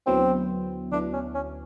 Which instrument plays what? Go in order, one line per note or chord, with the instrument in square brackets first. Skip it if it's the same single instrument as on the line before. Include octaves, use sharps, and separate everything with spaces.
[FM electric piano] D2 D3 F#3 B3 E4 [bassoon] C4
[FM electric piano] D2 D3 F#3 B3 E4 [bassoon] D4
[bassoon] C#4
C#4